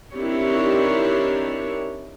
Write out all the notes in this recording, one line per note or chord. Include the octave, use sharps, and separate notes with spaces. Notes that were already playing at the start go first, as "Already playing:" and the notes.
D#3 C4 D4 E4 G4 C#5